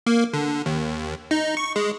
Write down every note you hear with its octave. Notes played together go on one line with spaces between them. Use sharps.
A#3
D3
D#2
D#4
C#6
G#3